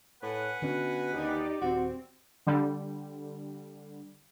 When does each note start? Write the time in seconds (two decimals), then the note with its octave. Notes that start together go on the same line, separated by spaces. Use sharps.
0.23 A2 B4 F#5 G#5
0.62 B2 D3 C#4
1.13 D#2 D#4 G4 D5
1.61 D#1 C4 F#4
2.47 D3 G3